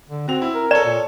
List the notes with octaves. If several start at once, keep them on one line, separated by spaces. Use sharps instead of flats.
D3
C4 F#4 F7
E4
A#4
A4 C#5 D5 E7
A#2